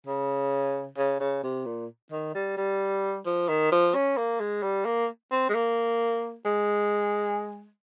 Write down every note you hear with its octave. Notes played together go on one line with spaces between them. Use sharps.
C#3
C#3
C#3
C3
A#2
D#3
G3
G3
F3
D#3
F3
C#4
A#3
G#3
G3
A#3
C4
G#3
A#3
G#3